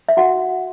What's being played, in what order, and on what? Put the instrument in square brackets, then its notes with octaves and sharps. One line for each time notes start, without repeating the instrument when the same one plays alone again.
[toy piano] E5
F#4 F#5